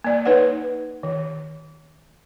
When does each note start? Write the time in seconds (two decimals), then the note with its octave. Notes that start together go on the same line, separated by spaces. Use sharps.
0.04 A#3 D5
0.25 D#4 B4 C#5 F#5
1.03 D#3